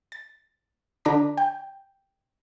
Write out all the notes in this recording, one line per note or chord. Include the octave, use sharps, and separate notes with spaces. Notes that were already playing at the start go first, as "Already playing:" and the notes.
A6
D3 D4 A#5 D6 A#6 B6
G5